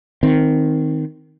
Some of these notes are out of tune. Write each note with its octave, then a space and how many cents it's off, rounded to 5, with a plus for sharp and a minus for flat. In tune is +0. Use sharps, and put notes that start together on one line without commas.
D#3 +0 C4 -15